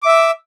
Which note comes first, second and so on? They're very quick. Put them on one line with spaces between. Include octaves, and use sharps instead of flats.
D6 E5 E6